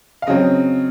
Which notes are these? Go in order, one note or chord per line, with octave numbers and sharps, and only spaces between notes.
F5
C#3 F#3 C4 D#5